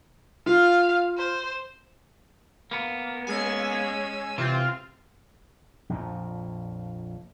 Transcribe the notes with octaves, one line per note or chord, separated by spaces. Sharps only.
F4 F5
C5
A#3 B3
G#3 C#4 G#5 E6
C3 E3 C4 F4
A#1 F2 A#2